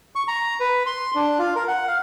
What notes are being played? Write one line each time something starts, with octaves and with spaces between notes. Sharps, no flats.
C#6
A#5
B4
C6
D4
F4
A#4
F#5
F5